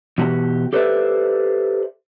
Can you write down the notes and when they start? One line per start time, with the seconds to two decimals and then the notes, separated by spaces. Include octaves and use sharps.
0.18 B2 E3 F#4 G4
0.73 G4 A4 B4 C5 D5 E5